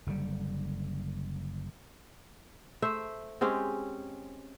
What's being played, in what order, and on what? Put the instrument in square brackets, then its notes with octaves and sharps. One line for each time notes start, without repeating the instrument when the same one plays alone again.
[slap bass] F#1 D3 G3
[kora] A3 C5 E5
G#3 C4 C#4 G4